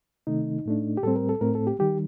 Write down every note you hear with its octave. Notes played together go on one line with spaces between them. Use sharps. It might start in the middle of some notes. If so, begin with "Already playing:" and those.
C3 D#3 A3 D#4
A2 A3 D4
G4
A2 G3 C4 A4
A#4
A4
A2 A3 C4 A#4
A4
G4
D#3 G3 G4